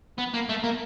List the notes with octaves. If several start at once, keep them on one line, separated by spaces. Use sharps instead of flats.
B3
A#3
A3
A#3